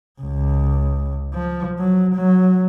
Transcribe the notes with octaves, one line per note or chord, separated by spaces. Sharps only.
C#2
F3
F#3
F#3